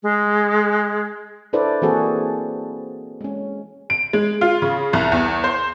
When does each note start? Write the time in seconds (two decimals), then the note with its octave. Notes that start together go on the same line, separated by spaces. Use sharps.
0.03 G#3
1.53 D4 E4 A4 B4 C5 D5
1.82 E3 A#3 C4 F#4 G#4 A4
3.21 G#3 C#4
3.90 D7
4.13 G#3
4.41 F4
4.62 C#3
4.93 C2
5.12 E2
5.44 C5